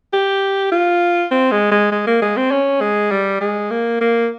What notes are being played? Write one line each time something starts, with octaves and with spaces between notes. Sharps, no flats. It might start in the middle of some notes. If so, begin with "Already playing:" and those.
G4
F4
C4
G#3
G#3
G#3
A#3
G#3
C4
C#4
G#3
G3
G#3
A#3
A#3